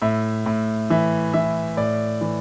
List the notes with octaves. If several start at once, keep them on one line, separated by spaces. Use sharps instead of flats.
A2 E5
A2
E3 E5
E3 E5
A2 D5
E3